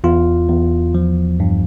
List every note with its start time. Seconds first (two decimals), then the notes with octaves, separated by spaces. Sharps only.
0.04 E2 F4
0.49 E2
0.95 F3
1.40 G2